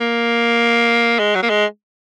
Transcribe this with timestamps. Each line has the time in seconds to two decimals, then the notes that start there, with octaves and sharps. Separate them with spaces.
0.01 A#3
1.19 G#3
1.35 F#3
1.43 A#3
1.50 G#3